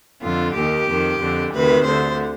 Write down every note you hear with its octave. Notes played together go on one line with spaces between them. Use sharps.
F2 D3 F4
D#2 D#3 G4
F2 D#3
F2 D3
D2 C3 D#3 B4
D2 D3 C5